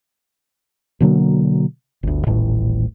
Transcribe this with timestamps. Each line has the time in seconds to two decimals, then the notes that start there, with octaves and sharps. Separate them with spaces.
1.00 B2 D3 F#3 A#3
2.03 G1 D2
2.27 D#1 A1 A2